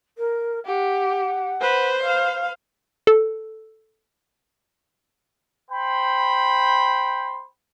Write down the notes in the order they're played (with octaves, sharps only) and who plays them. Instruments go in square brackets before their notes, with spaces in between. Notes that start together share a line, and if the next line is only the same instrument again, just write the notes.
[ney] A#4
[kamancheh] G4 [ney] F#5
[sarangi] B4 [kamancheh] C5
[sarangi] F5
[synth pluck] A4
[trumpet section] C5 G5 B5